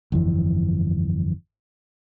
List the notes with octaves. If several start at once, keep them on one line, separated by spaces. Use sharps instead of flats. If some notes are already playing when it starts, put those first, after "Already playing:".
G1 F2 E3